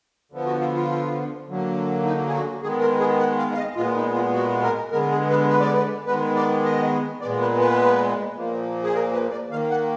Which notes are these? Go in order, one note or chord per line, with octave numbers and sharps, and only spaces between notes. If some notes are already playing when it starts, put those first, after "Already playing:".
D3 F3 B3
F#4
F4
F4
D3 F#3 A#3
D#4
G#4
F#4
D#3 G#3 B3 G#4
A#4
G#4
F#5
F5
F5
D#5
A#2 G#3 B3 F4
D#4
F4
F#4
A#4
D3 G#3 B3 A#4
G#4
B4
B4
D5
B4
D#3 G#3 B3 B4
D5
D#5
A#2 G#3 B3 D5
B4
B4
A#2 F3 A#3
G#4
A#4
B4
D5
D#3 A#3 F5
F#5